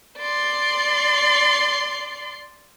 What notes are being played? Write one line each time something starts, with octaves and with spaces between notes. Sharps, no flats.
D5 C6